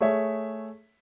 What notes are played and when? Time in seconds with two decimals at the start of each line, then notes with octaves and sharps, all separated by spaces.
0.01 A3 G#4 C#5 E5